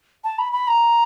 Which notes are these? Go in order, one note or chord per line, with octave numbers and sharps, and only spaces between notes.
A5
B5
B5
A#5